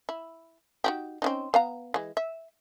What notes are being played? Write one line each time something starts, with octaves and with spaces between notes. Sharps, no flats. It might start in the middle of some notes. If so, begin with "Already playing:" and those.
E4
D#4 F#4 G4
C4 C#4 D#4
B3 F5 A#5
E3 G#3
E5